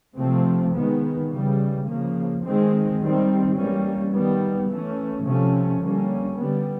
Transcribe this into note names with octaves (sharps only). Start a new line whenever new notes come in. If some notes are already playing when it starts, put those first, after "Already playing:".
C3 F3 A3 C4
D#3 G#3 B3
C#3 E3 G3
C#3 F3 A#3
D#3 G#3 C4
D#3 G3 C4
E3 G3 A#3 C#4
D#3 G3 B3
E3 A3 C#4
C3 F3 A3 C#4
D3 G3 A#3 C#4
D3 G3 B3